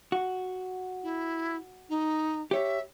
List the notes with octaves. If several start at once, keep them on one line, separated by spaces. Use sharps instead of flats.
F#4
E4
D#4
G4 C#5 E5